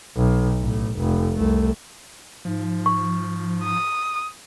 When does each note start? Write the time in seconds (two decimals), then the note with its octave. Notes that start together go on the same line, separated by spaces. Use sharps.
0.16 B1
0.62 A1
0.97 F1
1.36 C2 A3
2.45 G#2 F3
2.86 C#6
3.64 D#6